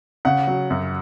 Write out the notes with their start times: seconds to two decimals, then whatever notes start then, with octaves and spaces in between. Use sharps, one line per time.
0.25 C#3 F#5
0.47 F#3
0.70 F#2